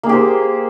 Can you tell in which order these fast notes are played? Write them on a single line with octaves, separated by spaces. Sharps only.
A#3 G#4 G4 C5